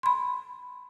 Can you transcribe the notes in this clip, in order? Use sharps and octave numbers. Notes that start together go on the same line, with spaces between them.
B5 C6